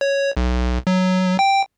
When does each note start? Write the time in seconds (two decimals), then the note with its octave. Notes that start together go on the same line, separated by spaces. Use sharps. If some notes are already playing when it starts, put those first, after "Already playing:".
0.01 C#5
0.37 B1
0.87 F#3
1.39 G5